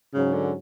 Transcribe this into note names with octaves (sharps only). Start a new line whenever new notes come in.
G#2 C#3 F#3 C#4
D3